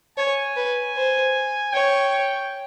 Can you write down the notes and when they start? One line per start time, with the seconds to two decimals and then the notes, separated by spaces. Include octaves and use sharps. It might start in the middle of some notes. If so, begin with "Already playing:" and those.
0.18 C#5 G#5
0.56 B4
0.97 C5
1.73 C#5 G5